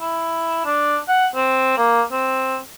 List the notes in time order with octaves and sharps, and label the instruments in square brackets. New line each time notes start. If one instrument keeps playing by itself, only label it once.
[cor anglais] E4
D4
F#5
C4
A#3
C4